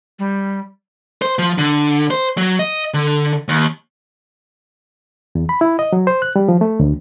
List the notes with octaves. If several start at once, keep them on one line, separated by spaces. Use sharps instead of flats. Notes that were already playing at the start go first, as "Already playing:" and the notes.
G3
C5
F3
D3
C5
F#3
D#5
D3
D#2
E2
B5
E4
D#5
F#3
C5
F#6
G3
F3
A3
D2